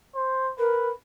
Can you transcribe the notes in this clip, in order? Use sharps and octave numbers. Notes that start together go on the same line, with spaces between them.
C5
A#4 B4